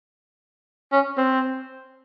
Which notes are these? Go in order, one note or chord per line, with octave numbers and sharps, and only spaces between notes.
C#4
C4